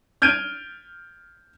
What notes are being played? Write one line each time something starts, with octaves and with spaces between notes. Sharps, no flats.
F6 G6 G#6 D7 D#7